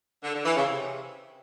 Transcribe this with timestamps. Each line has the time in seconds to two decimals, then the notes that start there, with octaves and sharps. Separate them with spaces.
0.23 D3
0.34 D3
0.45 E3
0.55 C#3
0.66 C3